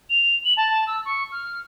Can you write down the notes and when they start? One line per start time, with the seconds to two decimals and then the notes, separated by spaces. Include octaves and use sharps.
0.10 F7
0.44 F#7
0.57 A5
0.87 E6
1.05 C#6
1.32 F6